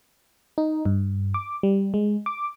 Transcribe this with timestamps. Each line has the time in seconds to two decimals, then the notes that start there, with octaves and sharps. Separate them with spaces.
0.58 D#4
0.85 G2
1.34 D6
1.63 G3
1.94 G#3
2.26 D6